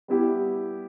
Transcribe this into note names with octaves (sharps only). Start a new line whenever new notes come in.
G3 B3 E4 G4